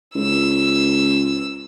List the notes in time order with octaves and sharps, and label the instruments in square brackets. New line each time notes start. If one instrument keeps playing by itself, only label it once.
[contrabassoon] C#2 [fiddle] E6